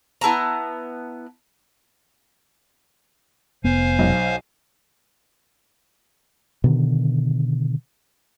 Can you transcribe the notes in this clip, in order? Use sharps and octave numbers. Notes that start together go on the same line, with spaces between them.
B3 E4 A5 A#5
F1 B3 C5 F5 G#5
B1
B2 D3 D#3